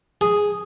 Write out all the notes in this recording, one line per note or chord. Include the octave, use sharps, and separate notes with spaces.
G#4